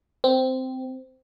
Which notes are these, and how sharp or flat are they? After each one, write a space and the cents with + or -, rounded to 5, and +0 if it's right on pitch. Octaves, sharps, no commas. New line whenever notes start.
C4 -10